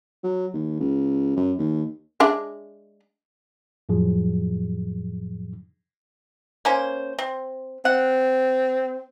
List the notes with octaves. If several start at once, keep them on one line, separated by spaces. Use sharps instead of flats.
F#3
D#2
C#2
F#2
D#2
G#3 D4 E5
F2 A2 F3 F#3 G#4
A#3 C#4 C5
C4
C4 F#5